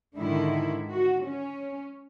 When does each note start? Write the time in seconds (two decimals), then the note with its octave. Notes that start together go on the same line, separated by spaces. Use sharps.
0.16 G#2 D3 D#3 E4
0.92 F#4
1.26 C#4